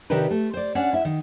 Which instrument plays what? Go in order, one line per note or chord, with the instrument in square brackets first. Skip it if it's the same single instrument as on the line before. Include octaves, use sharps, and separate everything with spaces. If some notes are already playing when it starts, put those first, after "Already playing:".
[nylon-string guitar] C3 D#3 D4 G4 A#4 B4
A3
C5 D5
C#4 D4 C#5 F#5
E4 E5
D#3